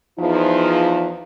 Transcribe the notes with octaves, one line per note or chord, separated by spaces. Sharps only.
E2 F3 D#4